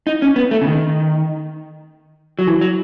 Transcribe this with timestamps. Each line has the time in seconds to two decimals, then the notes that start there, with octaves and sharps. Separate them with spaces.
0.07 D#4
0.22 C#4
0.36 B3
0.51 A3
0.62 C#3
0.67 D#3
2.39 F#3
2.47 E3
2.61 F#3